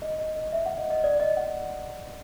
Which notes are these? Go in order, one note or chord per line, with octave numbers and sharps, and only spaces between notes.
D#5
D#5
D#5
E5
F#5
D#5
D#5
D5
D#5
F#5